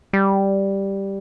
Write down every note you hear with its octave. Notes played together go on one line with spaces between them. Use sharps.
G3